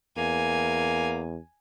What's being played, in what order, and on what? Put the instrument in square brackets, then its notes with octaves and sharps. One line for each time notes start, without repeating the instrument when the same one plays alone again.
[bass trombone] E2 [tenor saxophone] A#3 [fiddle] G#5